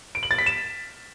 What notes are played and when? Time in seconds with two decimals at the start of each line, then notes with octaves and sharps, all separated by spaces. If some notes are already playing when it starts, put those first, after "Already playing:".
0.15 D7
0.23 F#7
0.31 A6
0.38 B6
0.46 E7